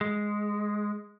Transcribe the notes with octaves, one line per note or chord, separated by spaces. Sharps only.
G#3